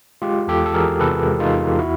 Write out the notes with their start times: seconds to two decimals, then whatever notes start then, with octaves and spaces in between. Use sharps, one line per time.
0.22 G#3 F4 G4
0.47 E2 G4 A4
0.66 A4
0.74 E3 G#4 A#4
1.00 C3 A4 B4
1.26 G#3
1.40 D#4 F4
1.53 E2
1.79 E4 F#4